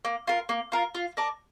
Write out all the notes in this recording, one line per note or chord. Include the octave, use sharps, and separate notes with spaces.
A#3
F4 A#4
A#3
F4 A#4
F4
A#4 D5 A5